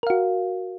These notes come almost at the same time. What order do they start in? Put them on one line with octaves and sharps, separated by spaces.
A#4 F5 F#4